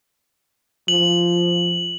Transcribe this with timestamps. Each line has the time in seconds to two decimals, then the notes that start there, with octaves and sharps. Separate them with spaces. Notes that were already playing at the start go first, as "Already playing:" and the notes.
0.88 F3 F#7